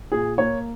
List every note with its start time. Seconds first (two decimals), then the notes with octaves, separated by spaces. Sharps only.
0.12 A#2 G#4
0.38 A#3 C#5